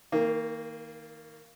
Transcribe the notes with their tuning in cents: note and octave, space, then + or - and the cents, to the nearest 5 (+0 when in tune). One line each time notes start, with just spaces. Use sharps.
D#3 +30 A#3 -15